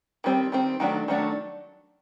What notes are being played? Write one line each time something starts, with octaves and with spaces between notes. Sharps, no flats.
D#3 G3 C4
D#3 G3 C4
D#3 F#3 A3 D4
D#3 F#3 A3 D4